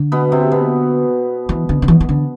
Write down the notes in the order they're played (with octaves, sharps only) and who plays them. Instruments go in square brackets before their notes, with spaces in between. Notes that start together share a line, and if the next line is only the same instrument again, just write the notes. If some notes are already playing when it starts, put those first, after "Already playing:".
Already playing: [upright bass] D3
[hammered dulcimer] B2 B3
C3 C4
B2 B3
[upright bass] E3
D3
D3
E3
E3
D3